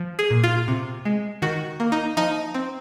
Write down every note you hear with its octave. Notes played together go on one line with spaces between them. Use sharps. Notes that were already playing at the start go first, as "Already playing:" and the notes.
Already playing: F3
G#4
A#2
F4
C3
G#3
D#3 F#4
A#3
D#4
F3 D#4
C4